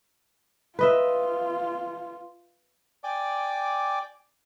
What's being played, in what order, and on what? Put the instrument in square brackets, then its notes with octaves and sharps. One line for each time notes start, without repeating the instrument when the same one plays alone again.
[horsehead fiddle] F4 [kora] B4 D#5 E5
[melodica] D5 G5 G#5 D6